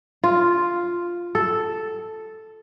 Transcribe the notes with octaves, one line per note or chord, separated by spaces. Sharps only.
F4
A4